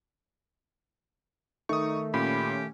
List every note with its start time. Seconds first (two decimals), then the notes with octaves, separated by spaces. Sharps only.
1.69 D#3 A3 D#4 C#6 D#6
2.14 A#2 C#4 G4 B5